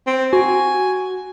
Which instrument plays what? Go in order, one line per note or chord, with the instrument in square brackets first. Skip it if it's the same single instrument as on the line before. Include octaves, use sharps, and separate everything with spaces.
[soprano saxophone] C4
[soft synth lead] F#4 [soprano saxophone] G#5